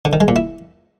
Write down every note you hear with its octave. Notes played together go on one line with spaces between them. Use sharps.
D3
D#3
G#3
A#2
E4